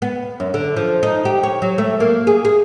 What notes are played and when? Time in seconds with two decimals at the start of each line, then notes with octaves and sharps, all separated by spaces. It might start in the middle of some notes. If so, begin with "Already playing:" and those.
0.02 B3
0.40 F#2
0.54 D3
0.76 F3
1.03 D#4
1.25 G4
1.43 C#5
1.62 F#3
1.78 A3
2.00 A#3
2.27 G#4
2.45 G#4